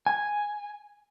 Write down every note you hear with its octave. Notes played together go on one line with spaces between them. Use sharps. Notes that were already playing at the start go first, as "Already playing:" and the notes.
G#5